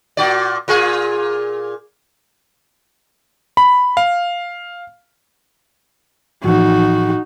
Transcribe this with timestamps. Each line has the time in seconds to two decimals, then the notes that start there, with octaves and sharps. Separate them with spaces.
0.17 A#2 F#4 D5
0.68 A#2 F4 G#4
3.57 B5
3.97 F5
6.44 A2 E3 F3 D#4 F#4